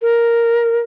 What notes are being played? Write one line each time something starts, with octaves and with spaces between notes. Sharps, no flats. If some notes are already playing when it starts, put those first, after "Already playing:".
A#4